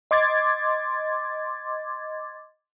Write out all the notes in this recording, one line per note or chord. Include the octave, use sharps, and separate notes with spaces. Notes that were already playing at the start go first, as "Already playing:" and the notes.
D#5 C6 D6 G#6 A6